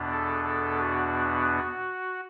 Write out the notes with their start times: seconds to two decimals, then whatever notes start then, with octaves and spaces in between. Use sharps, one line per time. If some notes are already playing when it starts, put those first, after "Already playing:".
Already playing: E2 B2 B3 D4
0.11 A4
0.45 A4
0.79 F#4